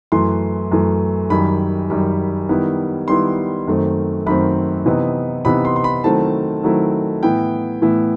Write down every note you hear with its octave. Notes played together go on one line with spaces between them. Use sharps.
F#2 E3 A3 C6
F#2 E3 A3
F#2 D#3 G3 B5
F#2 D#3 G3
D#3 G3 B3 E4
D#3 G3 B3 E4 C6
F#2 D#3 A3 C4
F#2 D#3 A3 C4 B5
C3 E3 B3 D#4
C3 E3 B3 D#4 B5
C6
C6
B5
D#3 F#3 A3 C4 E4 A5
D#3 F#3 A3 C4 E4
A2 E3 B3 E4 G5
A2 E3 B3 E4